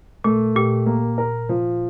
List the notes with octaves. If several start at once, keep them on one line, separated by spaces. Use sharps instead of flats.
A#2 A3
A#2 G4
A#3
A#4
F3